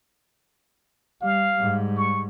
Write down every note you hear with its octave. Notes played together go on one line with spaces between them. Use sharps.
G3 F5
G#2 G3
C#6